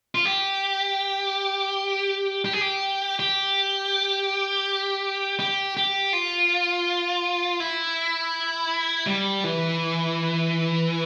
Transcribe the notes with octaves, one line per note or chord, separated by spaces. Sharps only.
F4
G4
G4
G#4
G4
G4
G4
G4
F4
E4
G3
E3